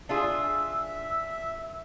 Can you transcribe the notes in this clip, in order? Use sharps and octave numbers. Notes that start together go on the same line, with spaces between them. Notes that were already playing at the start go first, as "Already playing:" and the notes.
D4 F4 G#4 E5 E6